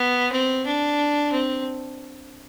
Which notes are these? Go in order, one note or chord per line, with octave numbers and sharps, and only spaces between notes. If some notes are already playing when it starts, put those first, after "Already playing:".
Already playing: B3
C4
D4
C4